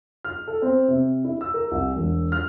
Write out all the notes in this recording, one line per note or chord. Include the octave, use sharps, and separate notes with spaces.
F6
A4
C4
C3
E4
E6
A#4
C2
E1
F6